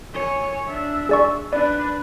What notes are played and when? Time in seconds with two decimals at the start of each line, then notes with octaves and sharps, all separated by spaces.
0.14 C#5 G#5
0.69 D4 E5
1.09 G#4 D5 C#6
1.53 D4 B4 D5